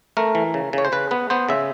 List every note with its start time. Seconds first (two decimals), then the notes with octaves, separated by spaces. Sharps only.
0.17 A3 A#4
0.35 E3
0.54 C#3
0.73 C#3 C#5
0.85 C5
0.92 C#3 B4
1.11 B3 B4
1.30 B3 C5
1.49 C#3 E5